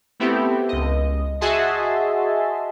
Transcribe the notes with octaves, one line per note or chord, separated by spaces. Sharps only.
A3 B3 C4 E4 G4
C#2 D#5
F#4 G#4 D#5 E5 A5 C6